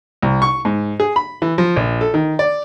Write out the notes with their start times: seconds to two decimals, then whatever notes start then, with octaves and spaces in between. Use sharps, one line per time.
0.23 C2
0.42 C#6
0.65 G#2
1.00 G#4
1.16 B5
1.42 E3
1.58 F3
1.76 A#1
2.01 A4
2.14 D#3
2.39 D5